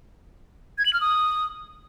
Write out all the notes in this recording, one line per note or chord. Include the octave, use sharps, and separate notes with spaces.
G#6
F#7
F6
D#6